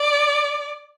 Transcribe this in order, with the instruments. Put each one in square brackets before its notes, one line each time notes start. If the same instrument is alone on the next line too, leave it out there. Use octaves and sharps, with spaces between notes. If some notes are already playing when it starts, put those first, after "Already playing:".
Already playing: [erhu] D5